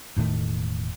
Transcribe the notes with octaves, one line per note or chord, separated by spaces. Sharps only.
E1 A2 D#3 A3